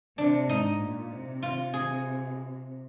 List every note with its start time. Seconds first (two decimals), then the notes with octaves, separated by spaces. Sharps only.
0.18 C3 D4
0.49 G#2 D#4
0.80 A#2
1.11 C3
1.42 F4
1.74 G#4